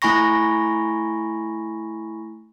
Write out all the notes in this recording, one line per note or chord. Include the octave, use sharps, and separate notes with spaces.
A3 E4 G#5 B5 C#6 A#6